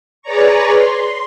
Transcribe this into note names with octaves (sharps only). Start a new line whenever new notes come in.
G#4 B4 C#5 D5 A#5 C#6
C6